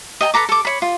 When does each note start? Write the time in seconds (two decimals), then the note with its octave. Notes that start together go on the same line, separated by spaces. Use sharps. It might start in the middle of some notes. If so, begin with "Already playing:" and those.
0.21 D#5 G5 G#5 A#5
0.34 A4 B4 A#5 D6
0.49 A4 D6
0.65 C#5 B5
0.82 F4